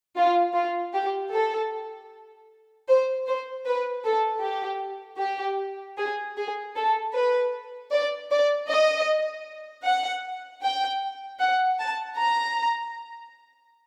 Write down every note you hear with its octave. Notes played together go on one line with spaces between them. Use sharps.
F4
F4
G4
A4
C5
C5
B4
A4
G4
G4
G#4
G#4
A4
B4
D5
D5
D#5
F#5
G5
F#5
A5
A#5